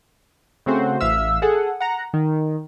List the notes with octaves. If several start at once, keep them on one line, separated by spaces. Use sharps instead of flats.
C#3 A3 C4 F#4 C5
A1 E5 F5 E6
G#4 A4 F#5
F#5 A#5
D#3